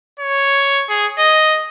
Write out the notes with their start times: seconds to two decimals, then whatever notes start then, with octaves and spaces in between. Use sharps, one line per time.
0.19 C#5
0.89 G#4
1.19 D#5